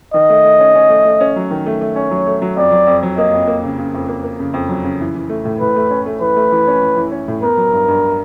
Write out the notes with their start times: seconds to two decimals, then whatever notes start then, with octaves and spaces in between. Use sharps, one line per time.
0.14 D#3 D#5
0.30 A3
0.44 A3
0.60 C#4
0.75 C#4
0.90 A3
1.05 A3
1.21 C#4
1.36 F#3
1.51 D#3
1.66 A3
1.81 A3
1.96 C#4 C#5
2.11 F#3
2.27 A3
2.42 F#3
2.57 F2 D5
2.72 F#3
2.87 F2
3.03 F#3
3.18 A#3 D#5
3.33 F2
3.47 A#3
3.63 C#3
3.78 C#3
3.94 F2
4.08 A#3
4.24 A#3
4.40 C#3
4.54 F2
4.69 F#3
4.84 C#3
5.00 E3
5.15 E3
5.30 A3
5.45 A2
5.60 A2 B4
5.76 A3
5.90 C#4
6.06 A3
6.21 E3 B4
6.36 A3
6.52 E3
6.67 C#4
6.81 E3
6.97 E3
7.12 C#4
7.28 A2
7.43 B3 A#4
7.57 F#3
7.73 G2
7.88 G2